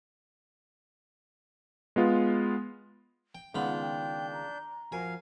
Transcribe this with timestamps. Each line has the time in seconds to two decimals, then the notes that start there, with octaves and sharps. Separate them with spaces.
1.96 G#3 B3 F4
3.35 G5
3.55 C#2 D#3 B3 D4 F4 F#5 B5 G6
3.81 G5
4.33 A#5
4.92 F3 F#4 A#4 F5 G#5